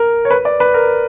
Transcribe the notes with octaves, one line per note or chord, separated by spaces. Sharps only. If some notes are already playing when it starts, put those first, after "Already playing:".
Already playing: A#4
C#5
B4
D5
B4
A#4